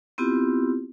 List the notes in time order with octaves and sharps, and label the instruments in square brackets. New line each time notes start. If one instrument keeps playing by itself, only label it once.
[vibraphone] B3 C4 E4 F4 G4